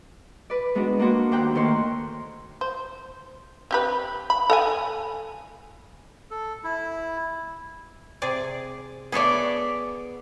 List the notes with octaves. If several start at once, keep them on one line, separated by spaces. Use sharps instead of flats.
B4 D5
G#3 B3 D4 D#4 F#4
A#3 D4 F#4 C6
D#2 D4 C5 G5 A#5 F#6
A2 D#3 A#3 C#5 C6
C5
C4 G4 B4
B5
A4 F#5 G#5
A4
E4
C3 G#4 D5
B3 G#4 A4 C#5 D5